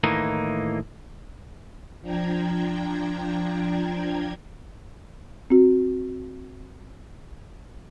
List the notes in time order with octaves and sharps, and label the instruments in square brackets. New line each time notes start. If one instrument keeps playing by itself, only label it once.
[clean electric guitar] A2 D#3 E3 A#3 D#4
[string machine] F3 D4 G5 A#5 G#6
[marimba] C4 F#4